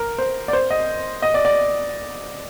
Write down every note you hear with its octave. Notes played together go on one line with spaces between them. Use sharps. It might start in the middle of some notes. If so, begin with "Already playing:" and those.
Already playing: A#4
C5
D5
C5
D#5
D#5
D5
D5